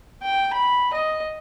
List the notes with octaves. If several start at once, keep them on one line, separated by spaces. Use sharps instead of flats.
G5
B5
D#5